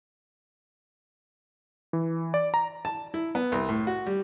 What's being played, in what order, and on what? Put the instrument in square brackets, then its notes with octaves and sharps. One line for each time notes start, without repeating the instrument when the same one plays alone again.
[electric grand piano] E3
D5
A#5
[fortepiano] A5
E4
B3
C2
A2
F#4
G3